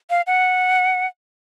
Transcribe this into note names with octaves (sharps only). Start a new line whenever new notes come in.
F5
F#5